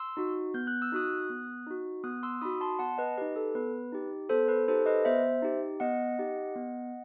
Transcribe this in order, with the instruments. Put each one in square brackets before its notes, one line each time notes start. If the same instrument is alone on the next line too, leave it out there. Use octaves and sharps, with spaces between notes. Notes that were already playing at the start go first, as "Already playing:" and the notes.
Already playing: [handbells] C6 E6
D#4 F#4
B3 G6
F#6
E6
D#4 F#4 D#6 F#6
B3
D#4 F#4
B3 D#6 F#6
C6 E6
D#4 F#4 B5 D#6
A5 C6
B3 F#5 A5
B4 D#5
D#4 G4 B4
A4
B3 B4
D#4 G4
B3 A4 C5
B4
D#4 G4 A4 C5
B4 D#5
B3 C5 E5
D#4 G4
B3 D#5 F#5
D#4 G4
B3